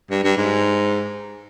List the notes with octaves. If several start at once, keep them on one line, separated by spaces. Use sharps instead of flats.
G2
G2
G#2